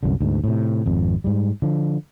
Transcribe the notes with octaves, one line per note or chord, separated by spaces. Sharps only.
C2 F#2 D3
D2 G#2
A2 C3
G#1 F2
G#2 G3
D3 F3